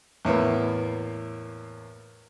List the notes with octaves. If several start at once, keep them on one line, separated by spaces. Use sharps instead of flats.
E2 A2 A#3 B3